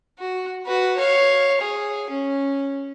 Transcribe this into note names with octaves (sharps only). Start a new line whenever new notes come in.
F#4
F#4 B4
C#5 F5
G#4
C#4